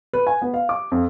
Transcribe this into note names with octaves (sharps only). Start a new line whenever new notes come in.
B4
G#5
B3
F5
D6
F2